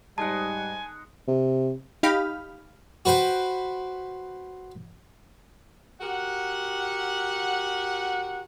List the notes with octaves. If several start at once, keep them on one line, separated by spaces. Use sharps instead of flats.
G#2 G3 G#3 D#4 F#5 G#5 A5
C3
D#4 G4 F5 B5 F6
F#4 B4 C5 G5
F#4 G4 A#4 F#5